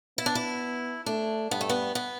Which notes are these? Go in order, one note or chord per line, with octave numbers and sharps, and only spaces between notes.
B3 E4
D4
E4
A3 D4
G2 B3
A3
B3
B3